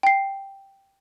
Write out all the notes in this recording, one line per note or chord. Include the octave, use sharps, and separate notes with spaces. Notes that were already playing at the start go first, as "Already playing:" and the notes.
G5 C7